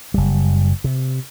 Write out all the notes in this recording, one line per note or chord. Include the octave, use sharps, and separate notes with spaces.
F#1 G3
C3